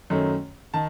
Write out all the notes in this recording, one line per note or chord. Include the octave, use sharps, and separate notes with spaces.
F#2 D#3 A3 C#4
D#3 A5